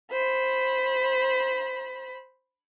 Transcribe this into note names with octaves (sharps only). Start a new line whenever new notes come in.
C5 B5